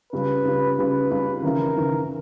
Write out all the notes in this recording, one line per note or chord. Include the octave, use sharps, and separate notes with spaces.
C#2 C#3 G3 B4
C#2 C#3 G3
C#2 C#3 G3 B4
C#2 C#3 G3
D#2 C#3 E3 A#4
D#2 C#3 E3